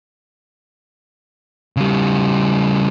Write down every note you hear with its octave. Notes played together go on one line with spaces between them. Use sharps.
C#3 G3